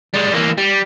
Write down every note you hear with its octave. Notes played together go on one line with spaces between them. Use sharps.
G3 G#3
E3 A#3
G3